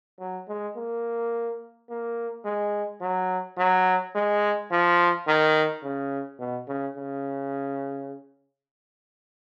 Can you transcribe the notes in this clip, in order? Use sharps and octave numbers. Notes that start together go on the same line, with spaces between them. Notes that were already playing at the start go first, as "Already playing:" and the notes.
F#3
G#3
A#3
A#3
G#3
F#3
F#3
G#3
F3
D#3
C#3
B2
C#3
C#3